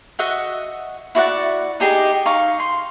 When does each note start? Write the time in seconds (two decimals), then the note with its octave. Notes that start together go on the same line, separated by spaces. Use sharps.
0.19 F#4 D#5 E5 F#5
1.15 E4 F#4 D5 F#5
1.80 D#4 G4 G#4 D#5
2.26 D#4 F5 C#6
2.60 C6